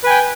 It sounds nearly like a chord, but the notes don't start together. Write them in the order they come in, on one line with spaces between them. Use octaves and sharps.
B4 G#5 G5